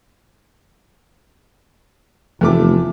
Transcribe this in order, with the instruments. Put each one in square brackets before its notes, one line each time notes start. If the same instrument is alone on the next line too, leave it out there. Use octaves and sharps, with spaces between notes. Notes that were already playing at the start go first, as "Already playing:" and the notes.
[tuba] F1 [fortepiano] E2 A3 D6